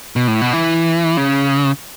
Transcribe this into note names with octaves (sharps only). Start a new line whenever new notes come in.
B2
A2
B2
E3
C#3